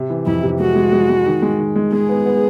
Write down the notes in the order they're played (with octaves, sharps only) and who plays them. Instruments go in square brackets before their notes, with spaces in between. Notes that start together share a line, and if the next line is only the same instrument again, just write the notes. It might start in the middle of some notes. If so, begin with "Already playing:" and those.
Already playing: [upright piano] C3
E3
[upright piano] F2 [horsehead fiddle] E4
[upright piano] C3
[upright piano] G#3 [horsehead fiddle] F#4
[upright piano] G#3
G#3
G#3
D#3
G#3
D#3
G#3
[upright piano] G#3 [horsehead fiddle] G#4
[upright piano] B3
B3